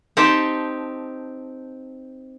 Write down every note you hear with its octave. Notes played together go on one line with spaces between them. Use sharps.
C4 D#4 G4 A5